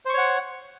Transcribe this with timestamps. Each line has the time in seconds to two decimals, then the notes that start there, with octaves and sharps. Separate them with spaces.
0.05 C5
0.09 C#6
0.14 C#5
0.18 F#5